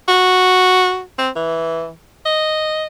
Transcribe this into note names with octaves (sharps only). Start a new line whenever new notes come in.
F#4
C4
E3
D#5